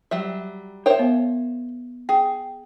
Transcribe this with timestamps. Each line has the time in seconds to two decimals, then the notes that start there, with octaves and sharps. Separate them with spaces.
0.11 F#3 G3 E5
0.86 A#4 C5 C#5 E5 G5
0.99 B3 F5
2.09 G#4 G5